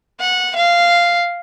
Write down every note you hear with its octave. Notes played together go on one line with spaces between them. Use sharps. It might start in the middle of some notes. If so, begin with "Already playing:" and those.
F#5
F5